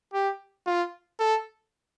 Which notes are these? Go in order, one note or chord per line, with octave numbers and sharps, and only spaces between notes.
G4
F4
A4